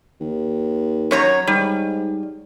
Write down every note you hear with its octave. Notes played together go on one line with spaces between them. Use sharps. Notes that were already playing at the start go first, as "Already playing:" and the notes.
D#2
F#2 C#5 A#5
G#2 G3